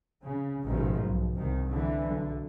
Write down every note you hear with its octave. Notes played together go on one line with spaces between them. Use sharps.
C#3
A1 G#2 B2 D#3 F3
B1
C2 D#3
D3 E3
B1 D3